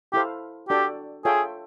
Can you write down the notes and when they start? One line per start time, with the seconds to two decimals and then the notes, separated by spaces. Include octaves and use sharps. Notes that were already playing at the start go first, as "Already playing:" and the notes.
0.13 E4 G4 A4 C5 F5
0.69 D4 F#4 G4 A4 D5 G5
1.25 F4 G#4 A4 C#5 E5 G5